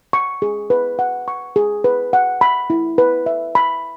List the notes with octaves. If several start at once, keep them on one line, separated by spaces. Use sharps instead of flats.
C#6
G#4
B4
F#5
C#6
G#4
B4
F#5
B5
E4
B4
E5
B5